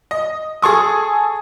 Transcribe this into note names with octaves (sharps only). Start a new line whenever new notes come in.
D#5
G#4 A4 C#6 D#6